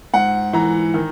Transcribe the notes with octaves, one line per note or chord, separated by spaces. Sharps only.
G#2 F#5
E3 A#5
D#3